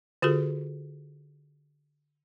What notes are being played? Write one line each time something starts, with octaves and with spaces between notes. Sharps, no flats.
D3 F4 F#4 G#4 A4